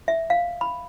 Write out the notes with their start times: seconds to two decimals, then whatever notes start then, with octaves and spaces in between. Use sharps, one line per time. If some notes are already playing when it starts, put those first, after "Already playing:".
0.08 E5
0.30 F5
0.61 B5